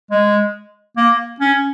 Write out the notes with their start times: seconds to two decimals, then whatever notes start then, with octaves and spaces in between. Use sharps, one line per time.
0.11 G#3
0.97 A#3
1.40 C#4